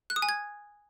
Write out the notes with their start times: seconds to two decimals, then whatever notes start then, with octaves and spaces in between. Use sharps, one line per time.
0.10 F#6
0.16 D#6
0.22 G#5
0.29 G#6